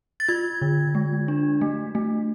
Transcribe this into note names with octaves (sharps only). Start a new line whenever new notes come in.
A6
F4 G#6
D3
G#3
D4
A3
A3